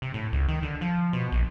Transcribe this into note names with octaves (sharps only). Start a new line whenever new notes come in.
C3
A2
C#2
D#3
D3
F3
B2
A#1